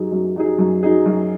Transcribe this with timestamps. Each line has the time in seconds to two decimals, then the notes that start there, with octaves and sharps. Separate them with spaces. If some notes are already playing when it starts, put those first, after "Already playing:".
Already playing: F#2 F#3 D#4 G#4
0.12 F#2
0.36 F#3 D#4 G#4
0.59 F#2
0.83 F#3 D#4 G#4
1.06 F#2